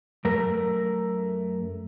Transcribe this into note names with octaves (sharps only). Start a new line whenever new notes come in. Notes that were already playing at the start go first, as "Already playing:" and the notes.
F#2 A3 A#4